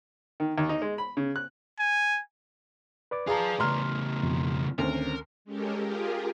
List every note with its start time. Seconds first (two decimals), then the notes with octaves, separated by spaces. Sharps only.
0.40 D#3
0.58 D#2
0.69 D#4
0.82 G#3
0.98 B5
1.17 C#3
1.36 F#6
1.79 G#5
3.11 B4 D5 D6
3.27 F4 G#4 F5 A5 A#5
3.59 A2 C#3 A#5 C6 F6
4.23 F2 B2
4.78 D2 D#3 C4 C#4 A#4
5.45 G#3 C#4 G4 A4 A#4
5.80 F4 G4 G#4 A#4